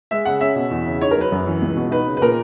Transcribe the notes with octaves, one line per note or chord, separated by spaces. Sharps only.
G#3 E5
C#3 F#5
C#4 E5
B2
E2
C#3
D#4 C#5
A#4
F#3 B4
F#2
E3
C#2
B2
D#4 B4
C#3
B4
A#2 A#4